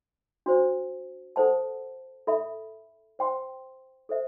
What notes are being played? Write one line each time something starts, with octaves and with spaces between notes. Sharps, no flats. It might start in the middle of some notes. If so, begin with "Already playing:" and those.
D4 F#4 C5
A4 C5 F#5 A5
A4 E5 B5
C5 G5 C6
A4 C5 E5